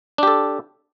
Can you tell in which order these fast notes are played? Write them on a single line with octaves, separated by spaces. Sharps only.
D4 G4 A4